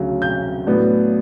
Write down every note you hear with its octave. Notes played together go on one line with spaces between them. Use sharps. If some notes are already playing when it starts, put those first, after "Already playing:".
Already playing: D2 C#3 F#3
G6
A2 F#3 B3 D4